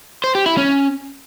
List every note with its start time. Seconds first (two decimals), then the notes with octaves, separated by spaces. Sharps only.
0.24 C5
0.35 G4
0.46 E4
0.57 C#4